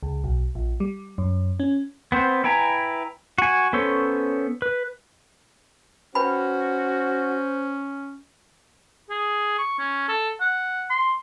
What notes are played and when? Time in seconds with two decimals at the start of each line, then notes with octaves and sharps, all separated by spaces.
0.03 C#2
0.24 B1
0.55 A#1
0.80 G3
1.18 F#2
1.60 C#4
2.12 B3 C4 C5
2.44 E4 B4 G5 G#5 A#5
3.38 F#4 G#5
3.73 B3 C#4 A4 C5 C#5
4.62 B4
6.15 C#4 F#4 B4 C5 G5 B5
9.10 G#4
9.58 C#6
9.79 C#4
10.08 A4
10.41 F#5
10.90 C6